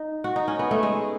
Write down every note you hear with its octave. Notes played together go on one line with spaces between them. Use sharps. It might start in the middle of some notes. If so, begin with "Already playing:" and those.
Already playing: D#4
F#4
D#4
C#4
B3
A3
G#3